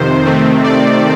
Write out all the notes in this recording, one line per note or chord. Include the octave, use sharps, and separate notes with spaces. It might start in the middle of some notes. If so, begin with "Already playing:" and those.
Already playing: F2 C3 D#3 C5
C3 D#3 A3 C4
D5